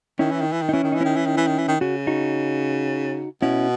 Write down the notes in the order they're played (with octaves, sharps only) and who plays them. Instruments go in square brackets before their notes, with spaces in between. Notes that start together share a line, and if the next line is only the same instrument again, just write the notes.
[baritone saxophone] D#3 [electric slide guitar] C#4 E4
[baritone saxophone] E3
D#3
E3
D#3
[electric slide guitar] D#4
[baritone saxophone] E3 [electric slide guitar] C#4 E4
[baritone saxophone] D#3
[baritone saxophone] E3 [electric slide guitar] D#4
[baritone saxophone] D#3 [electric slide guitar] C#4 E4
[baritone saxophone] E3
D#3
E3
D#3
E3
D#3
[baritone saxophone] C#3 [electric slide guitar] F#4
[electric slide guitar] D#4 F#4
[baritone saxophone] B2 [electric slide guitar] C#4 E4